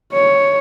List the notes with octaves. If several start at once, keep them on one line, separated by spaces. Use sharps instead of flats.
C#5